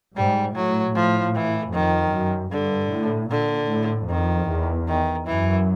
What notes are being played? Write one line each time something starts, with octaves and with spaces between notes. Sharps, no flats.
G#2 G3
A2 F#3
A2 F3
E3
F2 D#3
F#2
G2 D3
A2
A#2 D3
A2
F2 D#3
E2
D#3
F#2 E3